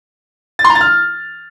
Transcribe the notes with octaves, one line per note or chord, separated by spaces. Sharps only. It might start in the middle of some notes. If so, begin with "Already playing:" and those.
A6
C6
A#5
A6
F6